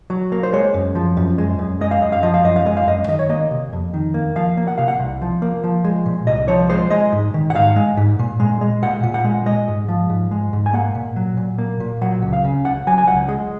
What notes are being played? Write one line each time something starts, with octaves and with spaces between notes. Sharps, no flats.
F#3
A#3
C5
G#3 C#5
F#2
F3
F#2
G#3
F#2
G#3 D#5
F5
F#2 D#5
F5
F3 D#5
F5
F#2 D#5
F5
G#3 D#5
F5
F#2 D#5
D#3 D#5
C#5
A#3 D#5
C3
F2
D#3
A#3
F3 F5
A#3
F#5
C3 F5
F#5
C2
F3
A#3
F3
G#3
A#2
C2 D#5
F3 C#5
G#3 C5
G#3 D#5
G#2
D#3
F#5
G#2 F5
G#3
G#2
A#2
G#3
G#3
A#2 F#5
A#2
F#5
G#3
G#3 D#5
G#2
F3
G#2
G#3
G#2
G#5
A#3 F#5
A#2
F#3
A#2
A#3
A#2
F#3 F#5
C#2
F5
C#3
C#2 F#5
F#3 G#5
G#5
C#2 F#5
G#3